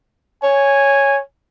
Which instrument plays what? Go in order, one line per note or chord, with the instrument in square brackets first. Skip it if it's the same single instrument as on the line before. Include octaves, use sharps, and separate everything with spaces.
[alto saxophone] C#5 [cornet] G#5